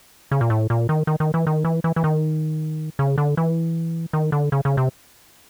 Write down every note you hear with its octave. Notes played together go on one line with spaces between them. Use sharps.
C#3
A#2
A2
A#2
D#3
D#3
D#3
E3
D#3
E3
E3
E3
D#3
C#3
D3
E3
D#3
D3
C#3
C#3
C3